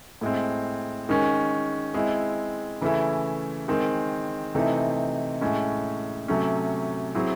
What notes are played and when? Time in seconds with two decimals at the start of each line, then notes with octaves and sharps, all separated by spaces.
0.21 A2 G#3 C4
1.09 D#3 G#3 C#4
1.94 G#3 C4 E4
2.81 C#3 E3 A3 C#4 E4
3.68 D#3 G#3 C4
4.55 C3 E3 A3 C4 D#4
5.41 A2 G#3 C#4
6.28 C3 F#3 A3 C#4
7.15 F#3 C4 E4 G#4